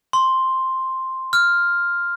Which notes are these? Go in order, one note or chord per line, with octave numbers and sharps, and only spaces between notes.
C6
F6